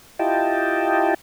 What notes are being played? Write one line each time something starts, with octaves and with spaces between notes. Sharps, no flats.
E4 F4 G4 D#5 G5 A5